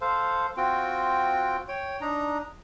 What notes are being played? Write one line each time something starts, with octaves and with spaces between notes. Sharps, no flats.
A4 C5 F5
C4 F4 F#4 G5
C#5 G5
D4 D#4 A#5